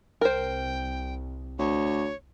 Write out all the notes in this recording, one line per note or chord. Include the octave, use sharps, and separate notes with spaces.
C2 A#4 C5 G5
D2 C#5